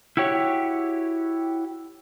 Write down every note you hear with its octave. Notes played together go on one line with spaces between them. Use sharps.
E4 F#4 G4 C#5